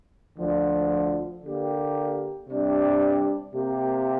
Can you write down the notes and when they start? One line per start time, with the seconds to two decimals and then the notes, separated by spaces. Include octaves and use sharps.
0.38 D2 D3 F3
1.43 D3 A#3 G4
2.48 C3 G3 D4 G4
3.53 C3 A#3 G4